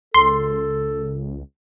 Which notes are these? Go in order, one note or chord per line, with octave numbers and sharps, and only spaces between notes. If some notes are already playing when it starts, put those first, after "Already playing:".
C#2 A4 C6